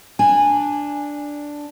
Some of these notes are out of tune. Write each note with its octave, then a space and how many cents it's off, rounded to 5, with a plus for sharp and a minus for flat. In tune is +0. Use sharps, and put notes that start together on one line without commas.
D4 +0 G#5 -15